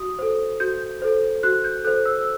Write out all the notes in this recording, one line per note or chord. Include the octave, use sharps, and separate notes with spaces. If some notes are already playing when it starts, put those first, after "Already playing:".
Already playing: F#4 D#6
A4 C5
F#4 G6
A4 C5
F#4 F#6
G6
A4 C5 F#6
E6